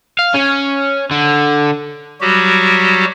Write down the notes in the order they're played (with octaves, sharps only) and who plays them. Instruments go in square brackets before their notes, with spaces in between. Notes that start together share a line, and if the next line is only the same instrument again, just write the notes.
[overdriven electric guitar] F5
C#4
D3
[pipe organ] F#3 G3 F#4 G4